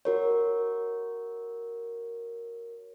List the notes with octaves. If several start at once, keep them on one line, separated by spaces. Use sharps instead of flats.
F#4 A#4 C#5